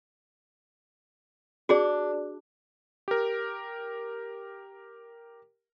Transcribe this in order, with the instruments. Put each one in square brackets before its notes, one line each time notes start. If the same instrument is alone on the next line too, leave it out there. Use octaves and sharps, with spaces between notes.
[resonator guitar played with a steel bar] D4 [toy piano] F#4 G#4 D5
[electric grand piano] G4 A#4